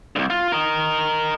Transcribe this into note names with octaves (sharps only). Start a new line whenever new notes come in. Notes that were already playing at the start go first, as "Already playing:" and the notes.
C2 G2
F4
A#4 D#5